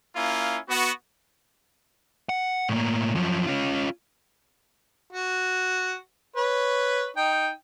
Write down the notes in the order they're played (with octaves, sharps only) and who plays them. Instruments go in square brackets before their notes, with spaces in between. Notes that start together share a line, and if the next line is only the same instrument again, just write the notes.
[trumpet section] A#3 C#4 E4 F4
B3 F#4
[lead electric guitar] F#5
A2 A#3
F#2 F3
C#4 F4
[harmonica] F#4
B4 C#5
D#4 G5